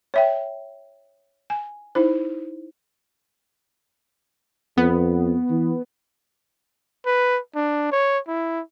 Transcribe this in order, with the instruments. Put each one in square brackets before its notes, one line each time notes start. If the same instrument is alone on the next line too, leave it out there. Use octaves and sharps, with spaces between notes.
[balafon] C#5 E5 G5
G#5
D#4 E4 C5
[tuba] F2 [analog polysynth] B3
[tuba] E3
[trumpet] B4
D4
C#5
E4